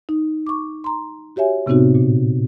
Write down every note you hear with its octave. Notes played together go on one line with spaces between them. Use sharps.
D#4
C#6 D6
A#5 C6
F#4 G4 C#5 E5 G#5
A2 C3 B3 C4 D#4 F#4
A#2